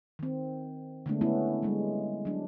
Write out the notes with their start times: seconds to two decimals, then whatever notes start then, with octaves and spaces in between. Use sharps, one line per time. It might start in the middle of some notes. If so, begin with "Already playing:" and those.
0.19 D#3 C4
1.06 D3 G#3 A3 B3 D4
1.21 A3 B3 C#4 E4
1.63 G3 G#3
2.25 F#3 D4